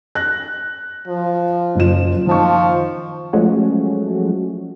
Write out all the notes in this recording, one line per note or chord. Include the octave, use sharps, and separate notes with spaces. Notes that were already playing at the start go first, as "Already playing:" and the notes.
F#6 A#6
F3
F#1 F4 E7
D#3 F3 A5 C#6
F3 F#3 G#3 A3 C#4 F#4